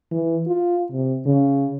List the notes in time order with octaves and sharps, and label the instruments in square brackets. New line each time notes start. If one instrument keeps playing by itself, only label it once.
[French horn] E3
F4
C3
C#3